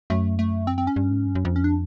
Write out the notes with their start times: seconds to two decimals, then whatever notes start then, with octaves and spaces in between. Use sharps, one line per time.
0.10 F#2 A3
0.39 A3
0.67 C4
0.78 C4
0.87 C#4
0.96 G2
1.11 G#2
1.27 G2
1.35 F#2
1.45 F2
1.56 C#4
1.64 D4